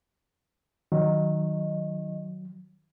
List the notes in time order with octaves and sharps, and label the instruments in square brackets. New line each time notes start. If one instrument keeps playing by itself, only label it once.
[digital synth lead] D#3 [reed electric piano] F#3